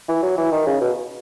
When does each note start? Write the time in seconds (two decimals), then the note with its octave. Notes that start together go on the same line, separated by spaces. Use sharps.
0.09 E3
0.23 F#3
0.37 E3
0.52 D#3
0.67 C#3
0.81 B2